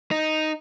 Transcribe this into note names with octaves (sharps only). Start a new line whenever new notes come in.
D#4